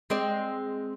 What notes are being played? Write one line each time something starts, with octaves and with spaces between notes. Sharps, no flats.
G#3 C4 D5